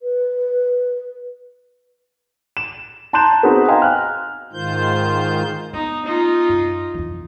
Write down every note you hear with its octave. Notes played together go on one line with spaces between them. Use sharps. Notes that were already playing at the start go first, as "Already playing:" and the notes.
B4
E7
A5 A#5 C6 F#6 G6 E7
B3 C4 D#4 F#4 G#4 B4
D#5 F5 G5 G#5 A#5 C6
F6 F#6
G#2 D#3 F4 C5 G6
B3 D#4
D#4 F4
F#2
F2 E3